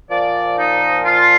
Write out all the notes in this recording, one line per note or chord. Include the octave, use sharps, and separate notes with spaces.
A#2 F3 D5
D#4
F4